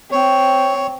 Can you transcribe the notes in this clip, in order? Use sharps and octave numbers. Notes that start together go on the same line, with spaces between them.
C4 C#5